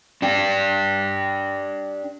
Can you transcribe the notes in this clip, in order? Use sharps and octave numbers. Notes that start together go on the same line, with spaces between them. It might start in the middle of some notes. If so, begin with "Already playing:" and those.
D4 G4